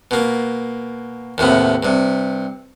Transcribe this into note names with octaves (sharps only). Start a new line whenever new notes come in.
B2 A#3
D#2 A2 C3 B3
G2 C3